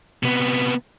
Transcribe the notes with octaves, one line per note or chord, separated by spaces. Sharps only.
C3 B3